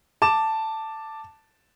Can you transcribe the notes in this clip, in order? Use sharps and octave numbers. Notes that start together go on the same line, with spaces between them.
A5 D6 E7